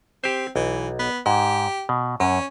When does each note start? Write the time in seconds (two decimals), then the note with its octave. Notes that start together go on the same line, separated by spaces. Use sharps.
0.24 C4 G4 C5
0.56 B1 E3
0.99 B3
1.26 G#2 G4
1.89 B2
2.20 F#2 C#4